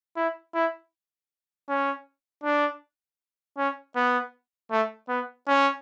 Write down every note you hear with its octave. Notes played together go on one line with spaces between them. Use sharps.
E4
E4
C#4
D4
C#4
B3
A3
B3
C#4